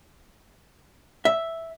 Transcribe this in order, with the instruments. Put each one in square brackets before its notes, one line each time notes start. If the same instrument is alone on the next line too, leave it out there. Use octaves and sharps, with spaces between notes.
[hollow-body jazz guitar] E5